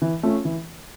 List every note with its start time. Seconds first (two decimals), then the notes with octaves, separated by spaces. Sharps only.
0.02 E3
0.23 A3 C#4 F4
0.45 E3